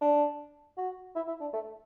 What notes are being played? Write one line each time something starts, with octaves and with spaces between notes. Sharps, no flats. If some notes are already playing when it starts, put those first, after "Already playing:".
D4
F#4
E4
E4
D4
A3